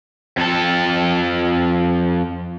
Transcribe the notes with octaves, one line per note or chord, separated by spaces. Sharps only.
F2 A4